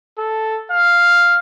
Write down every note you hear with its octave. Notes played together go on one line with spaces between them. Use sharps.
A4
F5